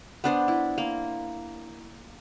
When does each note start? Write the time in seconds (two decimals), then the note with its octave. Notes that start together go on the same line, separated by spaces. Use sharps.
0.24 B3 D4 C5
0.48 E4
0.78 A#3